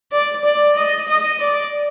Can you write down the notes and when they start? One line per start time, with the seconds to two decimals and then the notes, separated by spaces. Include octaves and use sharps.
0.12 D5
0.45 D5
0.76 D#5
1.08 D#5
1.41 D5